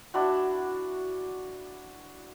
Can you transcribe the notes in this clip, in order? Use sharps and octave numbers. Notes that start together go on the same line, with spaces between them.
D4 E4 F#4